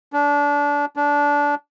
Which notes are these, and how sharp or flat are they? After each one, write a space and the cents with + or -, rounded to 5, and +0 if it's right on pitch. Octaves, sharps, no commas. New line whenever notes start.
D4 -25
D4 -20